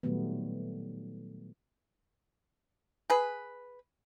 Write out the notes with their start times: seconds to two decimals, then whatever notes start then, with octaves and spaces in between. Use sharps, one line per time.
0.03 A#2 D#3 F#3 G3 A3 B3
3.10 G#4 B4